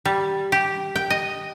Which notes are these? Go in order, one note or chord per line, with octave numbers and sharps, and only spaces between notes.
G3
G4
G5
D#5